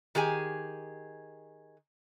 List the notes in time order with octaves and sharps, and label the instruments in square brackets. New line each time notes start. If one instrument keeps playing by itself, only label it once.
[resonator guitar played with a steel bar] D#3 G4 G#4 G#5